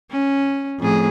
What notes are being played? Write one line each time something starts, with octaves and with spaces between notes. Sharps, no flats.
C#4
F2 A2 G#4